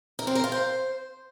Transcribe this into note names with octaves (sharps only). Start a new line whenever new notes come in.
A#4
C4
A#4
F4
C5